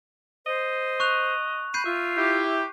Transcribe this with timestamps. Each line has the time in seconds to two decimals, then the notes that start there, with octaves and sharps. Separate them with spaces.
0.46 C5 D#5
1.00 C#6 F#6 F7
1.74 B5 G6 C7 D#7
1.86 F4 E5
2.17 E4 G4